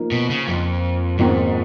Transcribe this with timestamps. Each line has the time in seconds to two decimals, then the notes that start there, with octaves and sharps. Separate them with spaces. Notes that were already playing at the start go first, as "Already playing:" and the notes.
Already playing: F3 A#3 D#4
0.11 B2
0.30 C#3
0.47 F2
1.18 F2 G#2 D#3 A#3 C#4